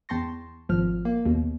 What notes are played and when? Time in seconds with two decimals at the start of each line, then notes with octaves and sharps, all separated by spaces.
0.09 E2 G5 A5 C6 C#6 A#6
0.69 G#1 F3 F6
1.05 A#3
1.26 D#2 B2